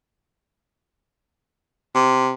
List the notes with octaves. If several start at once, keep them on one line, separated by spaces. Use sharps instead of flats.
C3